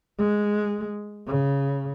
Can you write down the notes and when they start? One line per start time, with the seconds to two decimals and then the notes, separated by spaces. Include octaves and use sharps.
0.18 G#3
1.27 C#3